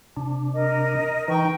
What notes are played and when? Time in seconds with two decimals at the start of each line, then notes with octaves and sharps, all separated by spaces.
0.17 C3 D4
0.53 A#4 D#5
1.28 E3 D#4 G5 C#6